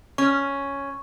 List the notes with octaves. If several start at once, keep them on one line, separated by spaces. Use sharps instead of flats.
C#4 C#6